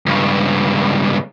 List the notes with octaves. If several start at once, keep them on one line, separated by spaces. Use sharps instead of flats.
C#2 G2